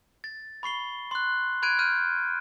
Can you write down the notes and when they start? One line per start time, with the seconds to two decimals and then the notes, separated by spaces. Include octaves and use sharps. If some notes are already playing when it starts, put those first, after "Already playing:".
0.24 A6
0.63 B5 C#6 C7 G7
1.11 C6 F#6
1.62 B5 F#6 G#6 D7 D#7
1.79 F6 G6 D#7